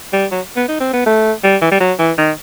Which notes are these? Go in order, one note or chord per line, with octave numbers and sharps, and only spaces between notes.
G3
F#3
B3
D#4
C4
B3
A3
G3
E3
G3
F#3
E3
D#3